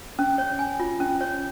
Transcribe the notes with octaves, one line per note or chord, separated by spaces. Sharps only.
C#4
C#5
G#5
F4
C#4
C#5